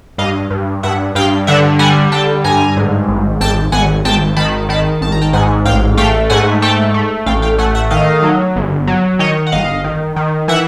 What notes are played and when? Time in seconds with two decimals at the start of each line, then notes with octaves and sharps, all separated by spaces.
0.18 G2 D#5 F5
0.50 G2
0.83 G2 E5 F#5
1.15 G2 F5 G5
1.47 D3 E5 F#5
1.79 G3 F#5 G#5
2.12 D3 G5 A5
2.44 G2 G#5 A#5
2.77 G#2
3.08 G#1
3.41 G#1 G5 A5
3.72 G#1 F#5 G#5
4.05 G#1 G5 A5
4.37 D#3 A5 B5
4.69 D#3 A5 B5
5.01 G#1 A5
5.12 A#5
5.21 G5 A5
5.33 G#2 F#5 G#5
5.65 A1 F5 G5
5.97 A3 F5 G5
6.30 G#2 F#5 G#5
6.62 A3 G5 A5
6.94 A3
7.26 A1 F5 G5
7.42 F5 G5
7.58 A3 F#5 G#5
7.75 E5 F#5
7.91 D#3 D#5 F5
8.23 F#3
8.56 G1
8.87 F#3
9.19 D#3 C#5 D#5
9.47 F#5
9.52 G1 D#5 F5
9.84 D#3
10.16 D#3
10.48 E3 E5 F#5